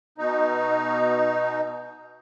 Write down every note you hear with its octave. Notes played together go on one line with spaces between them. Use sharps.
B2 D#4